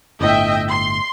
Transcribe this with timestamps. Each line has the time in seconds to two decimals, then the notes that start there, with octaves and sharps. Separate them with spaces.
0.21 G1 A2 D#5 E5 G5
0.69 C6